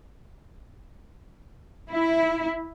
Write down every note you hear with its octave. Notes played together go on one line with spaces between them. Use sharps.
E4